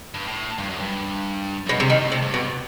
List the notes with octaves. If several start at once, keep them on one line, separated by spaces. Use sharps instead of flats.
G2
A2
G2
F#2
G2
F#2 B2
G2 C3
A2 D#3
C3
G2
B2